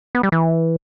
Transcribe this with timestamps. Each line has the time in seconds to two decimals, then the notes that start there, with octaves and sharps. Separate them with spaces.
0.15 B3
0.23 G3
0.32 E3